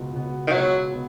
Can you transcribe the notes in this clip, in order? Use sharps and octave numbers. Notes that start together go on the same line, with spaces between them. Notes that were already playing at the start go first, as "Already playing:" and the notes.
Already playing: C#2 B2 B3
C#2 B2 B3
D#3
C#2 B2 F#3 B3
B2 B3